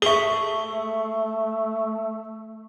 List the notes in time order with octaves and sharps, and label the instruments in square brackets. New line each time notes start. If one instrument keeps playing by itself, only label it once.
[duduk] A3 [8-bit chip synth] G#4 E5 [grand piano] C#6 G7